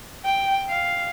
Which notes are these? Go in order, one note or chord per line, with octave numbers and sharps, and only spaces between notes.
G5
F5